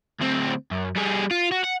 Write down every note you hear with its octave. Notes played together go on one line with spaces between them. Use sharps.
D2 C4
F#2
G3 G#4
F4
F#4
F#5